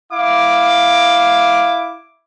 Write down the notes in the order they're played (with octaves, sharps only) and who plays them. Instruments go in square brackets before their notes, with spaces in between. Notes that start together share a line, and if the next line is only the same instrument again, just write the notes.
[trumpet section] E4 F5 D6